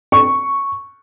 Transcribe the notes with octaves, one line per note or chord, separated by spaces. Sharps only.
C#6